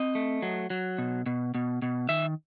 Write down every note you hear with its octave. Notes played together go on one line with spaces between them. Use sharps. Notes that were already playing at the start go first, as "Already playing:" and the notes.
Already playing: C4 D#5
A3
F#3
F#3
B2
B2
B2
B2
D#3 E5